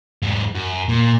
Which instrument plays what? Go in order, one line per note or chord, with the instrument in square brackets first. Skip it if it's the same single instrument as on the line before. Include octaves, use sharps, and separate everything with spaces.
[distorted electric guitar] G#2 F#3
F#2
A#2